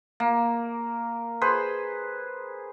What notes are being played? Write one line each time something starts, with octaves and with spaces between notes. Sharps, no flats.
A#3
G#4 B4 C5